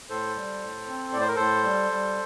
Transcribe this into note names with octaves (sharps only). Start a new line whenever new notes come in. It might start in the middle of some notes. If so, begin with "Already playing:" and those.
A2 A4 C5
G3
A2
C4
A2 D5
C5
A#4
A2 A4 C5
G3
G3